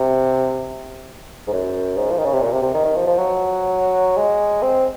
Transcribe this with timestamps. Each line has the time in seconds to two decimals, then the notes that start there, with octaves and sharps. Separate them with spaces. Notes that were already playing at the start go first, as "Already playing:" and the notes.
Already playing: C3
1.47 G#2
1.53 F#2
1.97 G#2
2.11 F3
2.18 D#3
2.25 C#3
2.33 C3
2.41 A#2
2.52 C3
2.62 C3
2.74 D#3
2.85 D#3
2.96 F3
3.07 F3
3.18 F#3
4.17 G#3
4.62 C4